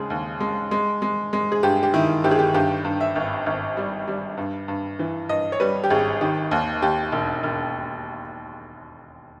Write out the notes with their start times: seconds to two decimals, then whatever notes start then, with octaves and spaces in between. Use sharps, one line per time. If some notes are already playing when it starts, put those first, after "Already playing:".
Already playing: D#2 C#3 G#3 G#4
0.10 D#2
0.40 G#3
0.71 G#3
1.02 G#3
1.33 G#3
1.52 G#4
1.63 G2 G4
1.83 G4
1.94 D#3 E4
2.24 G1 G4
2.31 G#4
2.39 G4
2.54 G2 G4
2.85 G2
3.01 E5
3.16 G#1
3.46 G#1
3.77 G3
4.08 G3
4.37 G2
4.68 G2
4.99 E3
5.29 G2 D#5
5.52 C#5
5.60 G3 B4
5.84 G4
5.90 G#1 G#4
6.21 D#3 G4
6.51 D#2
6.82 D#2 G4
7.12 E1
7.43 E1